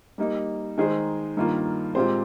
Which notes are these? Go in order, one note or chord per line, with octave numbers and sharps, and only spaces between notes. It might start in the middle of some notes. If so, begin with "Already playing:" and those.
G3 A#3 D#4
D#3 G#3 D#4 G#4 C5
G2 D#3 A#3 F4
A#2 G#3 C4 G4 C5